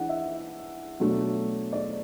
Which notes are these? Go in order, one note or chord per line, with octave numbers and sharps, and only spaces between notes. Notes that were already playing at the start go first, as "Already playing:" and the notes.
Already playing: E3 D4 F#5
E5
B2 F#3 A3 D4
D5